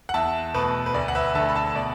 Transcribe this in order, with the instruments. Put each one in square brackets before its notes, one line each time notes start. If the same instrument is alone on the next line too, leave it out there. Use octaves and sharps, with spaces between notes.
[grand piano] F#5
E2 E5 A5
B2 A3 B4
B4
D2 D5
F#5
B4 E5
D3 A3 E5 A5
B5
E5 A5
B2 D5